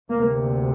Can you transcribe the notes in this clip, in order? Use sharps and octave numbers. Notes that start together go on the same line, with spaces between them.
D2 C3 A#3